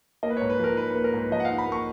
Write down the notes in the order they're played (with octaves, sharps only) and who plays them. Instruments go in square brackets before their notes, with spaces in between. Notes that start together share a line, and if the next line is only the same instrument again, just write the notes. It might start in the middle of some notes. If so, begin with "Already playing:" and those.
[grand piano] A#3 D#5
B4
C#5
G#2
B4
F3 A#4
D#4 B4
B4
A#3
A#4
G#2 B4
F3 D#5
F#5
F5
D#4
B5
A#3 C#6